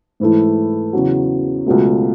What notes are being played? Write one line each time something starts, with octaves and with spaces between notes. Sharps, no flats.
G#2 E3 A3 E4
E2 C#3 F#3
C#2 B2 F#3 A3